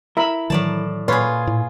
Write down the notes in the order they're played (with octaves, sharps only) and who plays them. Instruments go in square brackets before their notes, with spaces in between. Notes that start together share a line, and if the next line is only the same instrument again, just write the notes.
[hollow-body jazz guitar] E4 A#4 [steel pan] E5 B5
[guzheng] A2 D5 A5 [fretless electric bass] D#3 E3 F#3
[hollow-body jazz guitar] A#2 [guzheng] F4 G#4 [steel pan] B4 C#5
[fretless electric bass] A2